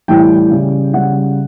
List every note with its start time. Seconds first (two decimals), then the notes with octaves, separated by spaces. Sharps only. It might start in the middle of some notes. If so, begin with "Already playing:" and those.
0.08 A2 E3 G3 G5
0.51 C#3 G3
0.94 C#3 G3 F#5